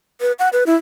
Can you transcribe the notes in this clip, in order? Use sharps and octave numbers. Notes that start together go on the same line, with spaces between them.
B4
F#5
B4
E4